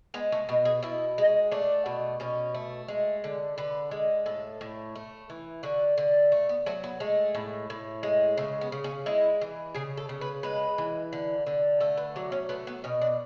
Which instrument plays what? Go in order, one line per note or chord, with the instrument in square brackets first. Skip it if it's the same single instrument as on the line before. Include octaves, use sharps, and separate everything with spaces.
[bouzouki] G#3 B3
A3
B2 B3
G#4
B2 E4
G#3
A3 D4
B2
B2 C#4
A3
G#3
D3
D3 B4
G#3
A2 A4
A2
A3
E3
D3 F#4
D3
A3
B3
F#3 A3
B3
G#3 A3
A2
A2
G#3
C#3 A3
B3
C#3
C#4
G#3 E4
E3
C#3 G#4
A4
C#3
B4
G#3 B4
E3
D3
D3
A3 A4
B4
F#3 D4
C#4
A3 B3
B3
B2 C#4
D4